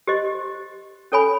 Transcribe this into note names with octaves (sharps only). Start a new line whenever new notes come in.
G4 C5 D#5 C6
C#4 A4 C#5 G#5 B5